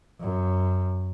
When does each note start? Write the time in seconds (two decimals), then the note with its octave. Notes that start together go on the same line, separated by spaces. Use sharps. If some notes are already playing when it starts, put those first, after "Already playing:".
0.21 F#2